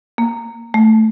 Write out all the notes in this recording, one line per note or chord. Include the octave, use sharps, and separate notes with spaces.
A#3
A3